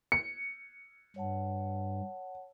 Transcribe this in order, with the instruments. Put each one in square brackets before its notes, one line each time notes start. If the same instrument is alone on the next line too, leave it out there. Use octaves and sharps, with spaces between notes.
[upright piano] C#7
[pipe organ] G2 [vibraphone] C#5 F#5 A5